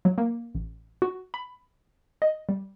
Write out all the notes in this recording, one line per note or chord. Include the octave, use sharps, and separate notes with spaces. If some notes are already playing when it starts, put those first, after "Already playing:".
F#3
A#3
A1
F#4
B5
D#5
G3